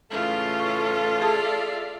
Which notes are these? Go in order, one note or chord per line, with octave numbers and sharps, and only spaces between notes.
A2 C#3 E3 F4 A4
C#6
G#4 D5 E5 F5 A5 D#6